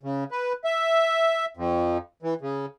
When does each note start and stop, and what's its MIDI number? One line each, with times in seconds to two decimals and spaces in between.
0.03 0.24 49
0.31 0.53 71
0.64 1.45 76
1.57 1.98 41
2.23 2.34 52
2.41 2.66 49